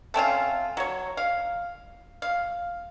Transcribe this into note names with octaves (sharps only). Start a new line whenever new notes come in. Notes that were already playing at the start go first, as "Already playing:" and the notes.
A3 C4 C#4 F4
F#3 C#5
F5
F5